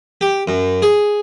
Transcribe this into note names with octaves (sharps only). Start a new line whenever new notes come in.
G4
F#2
G#4